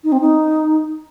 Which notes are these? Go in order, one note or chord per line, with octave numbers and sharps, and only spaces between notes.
D#4
C4
D#4